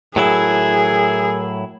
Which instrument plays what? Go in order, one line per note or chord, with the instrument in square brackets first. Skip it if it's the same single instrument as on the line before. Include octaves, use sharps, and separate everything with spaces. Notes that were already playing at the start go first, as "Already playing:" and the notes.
[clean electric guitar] A2 F#3 E4 [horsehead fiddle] G#4 [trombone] A#4